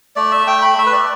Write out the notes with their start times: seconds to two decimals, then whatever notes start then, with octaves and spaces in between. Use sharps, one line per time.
0.16 A3 D5
0.31 E5
0.47 A3 G5
0.62 B5
0.78 A3 E5
0.86 B4
0.93 D5